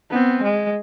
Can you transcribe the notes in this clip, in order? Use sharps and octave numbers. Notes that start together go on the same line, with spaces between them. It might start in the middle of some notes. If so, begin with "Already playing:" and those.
B3 C4
G#3